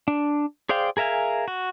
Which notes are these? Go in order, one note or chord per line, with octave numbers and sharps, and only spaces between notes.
D4
G#4 C5 D5 F5 G5
G#4 A#4 E5 F5 G#5
F#4